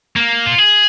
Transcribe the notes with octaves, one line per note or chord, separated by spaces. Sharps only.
A#3
F4
G#4